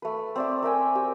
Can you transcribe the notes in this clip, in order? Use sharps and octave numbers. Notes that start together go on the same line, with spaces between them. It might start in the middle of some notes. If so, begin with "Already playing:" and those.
A3 B4
C4 D5 E5
A#4 E5 G5 G#5
G4